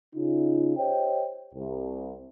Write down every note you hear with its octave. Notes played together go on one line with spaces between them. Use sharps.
C#3 D#4 F4
G4 C5 C#5 D#5 G5
C2